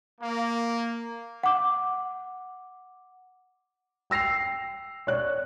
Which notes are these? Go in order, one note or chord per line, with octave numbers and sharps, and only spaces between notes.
A#3
F#5 D6
G5 E6 A#6 C7 F7
C#5 D5 F#6